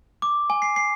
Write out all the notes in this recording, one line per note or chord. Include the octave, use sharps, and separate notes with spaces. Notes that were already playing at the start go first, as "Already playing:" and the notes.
D6
G#5
C7
C7